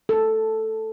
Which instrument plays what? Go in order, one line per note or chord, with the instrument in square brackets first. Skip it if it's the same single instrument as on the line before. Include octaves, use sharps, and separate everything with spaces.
[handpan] A4